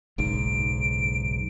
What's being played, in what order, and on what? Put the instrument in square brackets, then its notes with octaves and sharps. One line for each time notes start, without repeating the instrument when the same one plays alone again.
[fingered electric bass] F#1 B1 G#2 [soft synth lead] D7